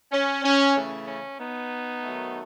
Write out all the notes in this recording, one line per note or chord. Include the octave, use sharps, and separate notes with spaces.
C#4
C#4
C#3 E3 A3
C#4
B3 D#4
D#3 F#3 A3